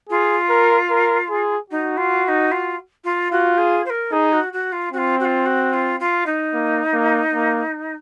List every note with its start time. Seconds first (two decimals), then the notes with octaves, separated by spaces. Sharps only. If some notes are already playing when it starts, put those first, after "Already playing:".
0.09 F4 G#4
0.50 A#4
0.90 A#4
1.30 G#4
1.70 D#4 F#4
1.97 F4
2.25 F4
2.28 D#4
2.51 F4
3.04 F4
3.32 F4 F#4
3.58 G#4
3.85 C5
3.90 A#4
4.12 D#4 G#4
4.32 F#4
4.53 F#4
4.72 F4
4.92 C4 F#4
4.98 F4
5.20 F#4
5.24 F4
5.46 F#4
5.73 F4
6.00 F4
6.26 D#4
6.53 A#3
6.93 A#3
7.34 A#3